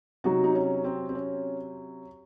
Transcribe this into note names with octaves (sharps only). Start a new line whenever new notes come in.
C3 F#3 D#4 F#4
D#4
C#4
C4
C4
C#4